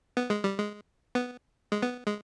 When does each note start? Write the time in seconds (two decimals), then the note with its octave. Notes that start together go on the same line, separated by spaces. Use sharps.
0.17 B3
0.30 G#3
0.44 G3
0.58 G#3
1.15 B3
1.72 G#3
1.82 B3
2.06 G#3